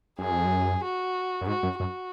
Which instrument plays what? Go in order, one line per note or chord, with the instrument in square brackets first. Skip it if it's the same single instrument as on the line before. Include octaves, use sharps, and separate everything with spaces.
[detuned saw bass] F#2 [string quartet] G#4
[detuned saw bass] F2
F#2
[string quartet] F#4
[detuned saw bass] F#2
[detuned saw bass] G#2 [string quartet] F#4
[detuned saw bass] F#2
[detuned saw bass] F#2 [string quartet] F#4